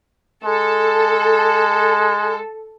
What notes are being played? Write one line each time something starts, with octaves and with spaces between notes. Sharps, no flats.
G#3 A4